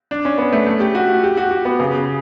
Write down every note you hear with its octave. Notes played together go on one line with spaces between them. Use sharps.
D4
C#4
B3
A3
A3
G4
F#4
G4
F#4
F#4
B3
C#3